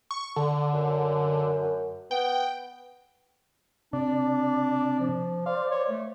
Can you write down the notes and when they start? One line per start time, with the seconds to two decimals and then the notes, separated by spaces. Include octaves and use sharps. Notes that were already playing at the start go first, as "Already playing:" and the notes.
0.11 C#6
0.36 D3
0.73 F#2
2.11 B3 G5
3.93 C3 D4 D5
5.00 F3
5.46 C5 D5 F5
5.71 C#5
5.90 A3